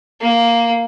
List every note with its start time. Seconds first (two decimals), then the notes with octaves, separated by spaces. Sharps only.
0.21 A#3